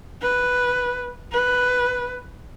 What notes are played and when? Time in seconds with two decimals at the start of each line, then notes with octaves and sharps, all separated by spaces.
0.22 B4
1.32 B4